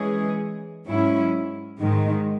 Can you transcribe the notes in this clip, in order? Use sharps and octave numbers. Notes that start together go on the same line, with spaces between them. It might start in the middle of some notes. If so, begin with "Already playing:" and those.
Already playing: E3 G#3 C#4 G#4
G#2 F#3 C#4 E4
G#2 D#3 G#3